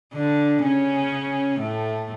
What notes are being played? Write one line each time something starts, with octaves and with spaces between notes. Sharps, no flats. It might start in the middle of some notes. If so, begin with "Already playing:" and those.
D3 D4
C#3 C#4
A2 A3